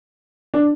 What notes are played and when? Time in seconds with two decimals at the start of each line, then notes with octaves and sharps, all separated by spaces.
0.54 D4